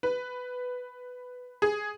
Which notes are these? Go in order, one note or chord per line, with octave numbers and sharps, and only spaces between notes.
B4
G#4